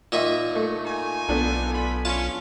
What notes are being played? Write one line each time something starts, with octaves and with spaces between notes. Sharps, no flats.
A#2 D#3 E5
A3
D#4 F4 G#5
B1 B3 D4 A4
A3 F4 B5
C#4 F4 A5